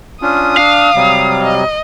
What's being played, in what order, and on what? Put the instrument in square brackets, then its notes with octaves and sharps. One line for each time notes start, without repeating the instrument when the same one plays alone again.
[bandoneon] C#4 D4 F4 [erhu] D#6
[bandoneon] D4 [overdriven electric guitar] F5
[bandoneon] C3 F#3 G3
[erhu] D#5